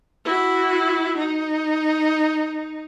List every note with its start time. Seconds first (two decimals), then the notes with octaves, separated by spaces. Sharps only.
0.25 E4 F#4
1.17 D#4